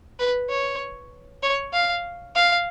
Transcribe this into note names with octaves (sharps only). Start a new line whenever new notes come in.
B4
C#5
C#5
F5
F5